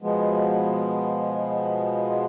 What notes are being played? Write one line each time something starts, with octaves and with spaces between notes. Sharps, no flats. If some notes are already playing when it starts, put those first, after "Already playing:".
B2 F3 G#3 B3